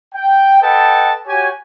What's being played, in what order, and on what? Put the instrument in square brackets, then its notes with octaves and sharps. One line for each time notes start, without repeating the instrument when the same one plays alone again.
[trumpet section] G5
A4 B4 D#5 F#5 G5 A5
F#4 G4 C#5 G#5